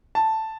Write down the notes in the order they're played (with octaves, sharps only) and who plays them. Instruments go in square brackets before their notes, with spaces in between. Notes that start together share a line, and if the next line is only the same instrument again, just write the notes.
[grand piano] A5